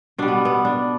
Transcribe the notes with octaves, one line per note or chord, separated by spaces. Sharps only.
B2 G3 D4
B3
B3
D4